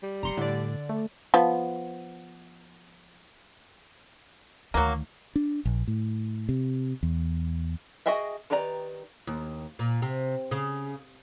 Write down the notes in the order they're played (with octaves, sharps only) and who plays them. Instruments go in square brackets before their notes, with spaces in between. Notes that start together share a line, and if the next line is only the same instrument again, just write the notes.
[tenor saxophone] G3
[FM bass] F1 [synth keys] A#5 C6 C#7
[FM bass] A2 [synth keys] D3 D5
[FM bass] A3
[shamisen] F3 B3
[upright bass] D2 D#3 [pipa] F#3 A#3
[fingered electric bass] D4
A#1
A2
C3
E2
[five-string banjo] F#4 G#4 D#5 E5 G5
D#3 G4 B4 D5 A#5
[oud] D#2
A#2
C3
C#3